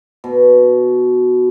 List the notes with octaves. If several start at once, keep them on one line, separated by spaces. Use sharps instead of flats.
B2